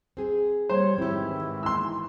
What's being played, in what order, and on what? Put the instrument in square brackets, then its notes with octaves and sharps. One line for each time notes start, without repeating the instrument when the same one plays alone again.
[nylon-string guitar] C4 G#4
[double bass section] G3 [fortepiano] C5 [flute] C#5
[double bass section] G#2 D#3 E3 [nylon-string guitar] C4 G4 [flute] E4
[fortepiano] C6 E6